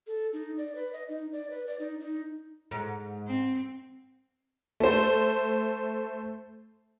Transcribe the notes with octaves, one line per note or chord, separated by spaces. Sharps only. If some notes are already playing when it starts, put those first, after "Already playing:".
A4
D#4
D5
B4
D#5
D#4
D5
B4
D5
D#4
D#4
G#2
C4
A3 C5